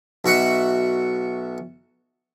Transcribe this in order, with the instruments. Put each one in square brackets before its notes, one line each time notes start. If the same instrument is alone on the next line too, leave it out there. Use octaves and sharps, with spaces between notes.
[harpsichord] B1 F#4 E5 F#5